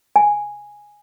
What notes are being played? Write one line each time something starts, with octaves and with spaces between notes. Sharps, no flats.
G#5